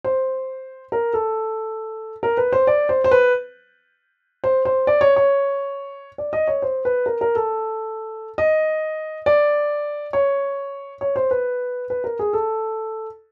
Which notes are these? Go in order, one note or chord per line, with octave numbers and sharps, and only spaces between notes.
C5
A#4
A4
A#4
B4
C5
D5
C5
C5
B4
C5
C5
D5
C#5
C#5
D5
D#5
C#5
C5
B4
A#4
A#4
A4
D#5
D5
C#5
C#5
C5
B4
B4
A#4
G#4
A4